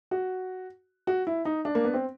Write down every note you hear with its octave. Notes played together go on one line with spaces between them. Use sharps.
F#4
F#4
E4
D#4
D4
A#3
B3
C4